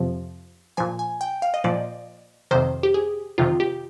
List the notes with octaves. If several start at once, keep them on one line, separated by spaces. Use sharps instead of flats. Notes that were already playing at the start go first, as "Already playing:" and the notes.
Already playing: F2 C3 F3
A#2 F3 G#5
G#5
G5
F5
D#5
A#2 F3 D5
F2 C3 D#3 C5
G4
G#4
F2 C3 D#3 F4
G4